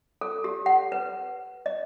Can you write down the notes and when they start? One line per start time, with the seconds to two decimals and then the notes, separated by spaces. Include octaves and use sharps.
0.21 A4
0.44 G4
0.66 F#5
0.92 B4
1.66 D#5